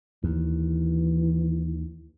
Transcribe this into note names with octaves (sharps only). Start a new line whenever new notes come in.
D#2 E3